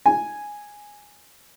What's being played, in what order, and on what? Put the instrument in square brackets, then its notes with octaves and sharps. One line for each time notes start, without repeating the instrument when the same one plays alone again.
[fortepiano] G#5